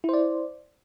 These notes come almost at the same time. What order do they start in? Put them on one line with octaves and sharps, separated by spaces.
E4 C5 D5